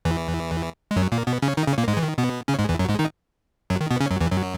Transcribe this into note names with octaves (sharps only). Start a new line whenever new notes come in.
E2 E3
G#3
F#2 F#3
A#2 A#3
B2 B3
C#3 C#4
D#3 D#4
C#3 C#4
A#2 A#3
G#2 G#3
E3
D#3
B2 B3
C#3 C#4
G#2 G#3
E2 E3
F#2 F#3
G#2 G#3
D#3 D#4
F#2 F#3
D#3
B2 B3
C#3 C#4
F#2 F#3
E2 E3
F#2 F#3